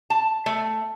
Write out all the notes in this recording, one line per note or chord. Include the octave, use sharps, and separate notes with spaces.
A5
A3